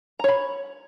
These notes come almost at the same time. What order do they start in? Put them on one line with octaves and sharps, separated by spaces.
A#5 C#5 B5